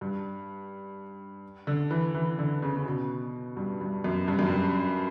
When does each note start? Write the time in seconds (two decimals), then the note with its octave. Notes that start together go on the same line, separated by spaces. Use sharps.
0.01 G2
1.67 D3
1.91 E3
2.15 E3
2.39 D3
2.62 C#3
2.76 C#3
2.85 B2
3.57 G2
3.81 G2
4.04 F#2
4.28 G2
4.39 F#2
4.50 G2